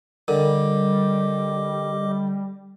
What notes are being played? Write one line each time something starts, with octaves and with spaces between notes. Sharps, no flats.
D3 G3 A#4 D#5 D6